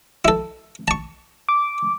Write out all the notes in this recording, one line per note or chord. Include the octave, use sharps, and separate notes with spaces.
E4 A4
A5 C#6
D6